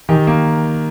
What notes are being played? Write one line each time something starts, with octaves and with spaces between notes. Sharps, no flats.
D#3 G4
A#3